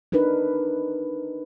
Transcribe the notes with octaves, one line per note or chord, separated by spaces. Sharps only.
D4 D#4 A#4 B4